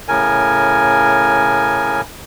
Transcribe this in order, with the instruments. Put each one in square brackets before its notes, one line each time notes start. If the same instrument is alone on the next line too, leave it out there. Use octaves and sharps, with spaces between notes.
[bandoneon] A2 C#3 A#4 G#5